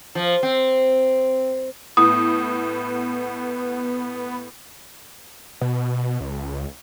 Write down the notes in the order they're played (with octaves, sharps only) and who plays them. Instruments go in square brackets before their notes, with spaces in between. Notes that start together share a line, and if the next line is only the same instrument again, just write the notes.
[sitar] F3
C4
[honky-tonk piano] A2 [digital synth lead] B3 [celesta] D#6
[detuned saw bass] B2
C#2